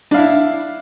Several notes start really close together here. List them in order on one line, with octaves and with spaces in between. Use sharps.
D4 F5 E4